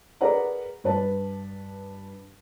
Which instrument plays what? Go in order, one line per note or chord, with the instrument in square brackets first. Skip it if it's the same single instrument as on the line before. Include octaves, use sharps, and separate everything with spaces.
[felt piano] G#4 A#4 B4 D5 F#5 A#5
G2 B4 A5